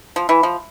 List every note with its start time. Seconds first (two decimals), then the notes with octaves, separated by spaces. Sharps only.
0.16 F3
0.29 E3
0.43 F3